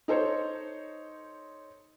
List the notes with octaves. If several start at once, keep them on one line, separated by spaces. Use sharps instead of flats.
D#4 A4 C5 C#5